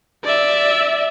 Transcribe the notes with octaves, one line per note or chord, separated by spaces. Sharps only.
D5 E5